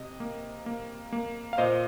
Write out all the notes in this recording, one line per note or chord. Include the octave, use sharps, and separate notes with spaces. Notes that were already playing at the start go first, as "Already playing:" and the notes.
Already playing: C3 D#5
A#3
A#3
A#3
F5
A#2 C5 D#5